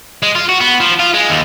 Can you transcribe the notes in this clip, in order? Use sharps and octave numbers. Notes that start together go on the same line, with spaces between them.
G#3
F4
F#4
B3
F3
F4
G#3
D#2